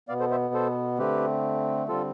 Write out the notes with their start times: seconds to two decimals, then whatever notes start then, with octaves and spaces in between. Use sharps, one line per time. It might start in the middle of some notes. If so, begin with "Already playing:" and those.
0.09 B2 B3 D5 F5
0.20 A4 C5
0.31 C5 E5
0.54 A4 C5
0.98 D3 A3 C4 G4 B4
1.88 D3 G3 C4 F4 A4